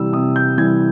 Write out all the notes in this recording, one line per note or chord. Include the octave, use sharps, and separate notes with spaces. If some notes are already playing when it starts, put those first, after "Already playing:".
Already playing: C3 E3 G3 E6
C3 D#6
G6
E3 G3 G#6